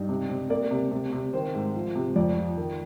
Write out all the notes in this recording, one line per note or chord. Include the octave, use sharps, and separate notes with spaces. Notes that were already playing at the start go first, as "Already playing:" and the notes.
Already playing: G2 D#4
C3
C3
A#3 D5
C3
C3
C3
D#3 C5
G#2
F3
C3
F2 D5
F3
D#3